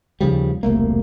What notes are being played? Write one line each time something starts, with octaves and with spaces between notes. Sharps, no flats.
D#2 C#3 F3 G3
E1 C2 A3 A#3